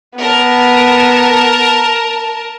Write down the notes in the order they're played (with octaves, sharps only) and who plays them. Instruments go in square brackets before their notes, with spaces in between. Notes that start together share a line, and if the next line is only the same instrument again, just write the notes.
[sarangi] B3 [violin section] A#4 A5